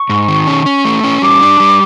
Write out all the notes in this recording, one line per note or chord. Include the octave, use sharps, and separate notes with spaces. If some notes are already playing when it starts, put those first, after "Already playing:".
Already playing: C#6
G#2
D#3
C#4
C#4
A3
C#4
G3 D6
D4
G3